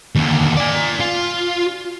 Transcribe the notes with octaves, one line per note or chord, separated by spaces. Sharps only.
D#2 D3
D5 G#5
F4